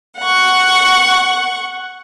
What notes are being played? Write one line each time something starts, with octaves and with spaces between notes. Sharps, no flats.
F#5 C#6